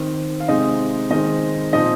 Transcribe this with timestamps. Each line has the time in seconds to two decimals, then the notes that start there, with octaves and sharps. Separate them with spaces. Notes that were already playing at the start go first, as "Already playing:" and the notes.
Already playing: D#3 C4
0.40 F5
0.48 C3 G#3 C4 D#4 D#5
1.10 D#3 G#3 C4 D#4 D#5
1.73 A#2 F3 C4 D#4 D#5